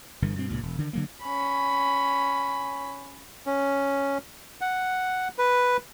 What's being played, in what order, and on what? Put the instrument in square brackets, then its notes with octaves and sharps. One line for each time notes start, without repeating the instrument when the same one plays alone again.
[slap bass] G1 G2 D3 E3
G2 B2 C4
C#2 G2 A#2
E1
D3 D#3
D3 F#3 A#3
[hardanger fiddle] C#4 B5
[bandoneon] C#4
F#5
B4